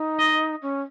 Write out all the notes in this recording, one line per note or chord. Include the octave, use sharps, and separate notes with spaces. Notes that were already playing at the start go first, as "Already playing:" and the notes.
Already playing: D#4
D#5
C#4